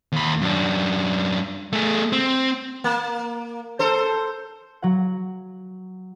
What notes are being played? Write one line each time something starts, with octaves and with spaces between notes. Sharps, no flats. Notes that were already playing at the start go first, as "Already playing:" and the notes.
D#2 B5
F#2 D4
A3 G#4
C4
A#3
A4 C5
F#3 F#5